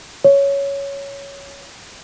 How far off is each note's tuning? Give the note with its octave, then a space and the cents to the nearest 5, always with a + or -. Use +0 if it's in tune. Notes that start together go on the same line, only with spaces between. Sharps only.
C#5 +5